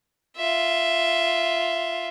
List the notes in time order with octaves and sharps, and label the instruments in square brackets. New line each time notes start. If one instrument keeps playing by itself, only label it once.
[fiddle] F4 E5